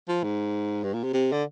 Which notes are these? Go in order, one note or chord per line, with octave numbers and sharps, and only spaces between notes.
F3
G#2
G2
A#2
C3
C3
D3